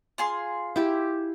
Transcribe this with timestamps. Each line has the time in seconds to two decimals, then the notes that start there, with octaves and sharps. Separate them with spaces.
0.18 F4 G#4 C6
0.76 E4 G4